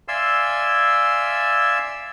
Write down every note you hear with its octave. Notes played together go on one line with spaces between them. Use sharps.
D5 E5 F5 G#5 C6 E6